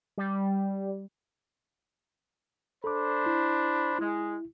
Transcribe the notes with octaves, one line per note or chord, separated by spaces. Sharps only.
G3
D4 A4 C5 B5 D6
E4
G#3 E4